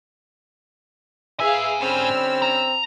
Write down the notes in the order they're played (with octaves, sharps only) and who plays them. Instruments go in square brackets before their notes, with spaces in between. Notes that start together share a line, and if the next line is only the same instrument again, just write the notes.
[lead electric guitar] G#2 G#5 [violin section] G#4 F5 [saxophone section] B4 E5
[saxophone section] D3 G3 C#4 [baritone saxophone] C4 [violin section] B5 E6 F6
[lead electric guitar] A#5